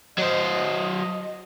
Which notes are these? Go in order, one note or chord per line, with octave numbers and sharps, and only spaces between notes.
F#3 C5 D#5